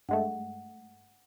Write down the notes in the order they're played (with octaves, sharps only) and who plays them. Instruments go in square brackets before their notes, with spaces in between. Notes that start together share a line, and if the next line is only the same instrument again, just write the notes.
[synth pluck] G2 G#3 A3 [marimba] F#5